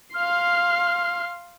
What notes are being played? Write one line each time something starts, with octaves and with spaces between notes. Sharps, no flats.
F5 C6 F6